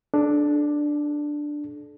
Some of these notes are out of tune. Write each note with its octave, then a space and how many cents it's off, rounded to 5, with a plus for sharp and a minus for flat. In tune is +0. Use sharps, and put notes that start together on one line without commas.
D4 +5 A4 -35